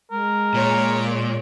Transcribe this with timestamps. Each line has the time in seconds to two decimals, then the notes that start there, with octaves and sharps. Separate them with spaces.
0.11 G#3 A#4
0.54 A#2 C#5 D7